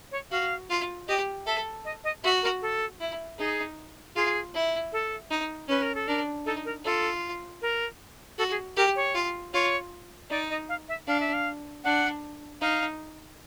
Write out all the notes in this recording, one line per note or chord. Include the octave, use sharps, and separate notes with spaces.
C#5
F#4 F5
F4
G4 D#5
A4 E5
D#5
D#5
F#4 E5
A#4
A4
E4
D#4 G#4
F4 G#4
E4
A4
D#4
C#4 B4
A#4
A4
D4 A#4
D#4 A4
A#4
F4 A4
A#4
F#4 A4
G#4
G4 A#4
C#5
F4
F4 C#5
D#4 D5
D#5
F5
E5
D4 F5
E5
F5
D4 F#5
D#4 F5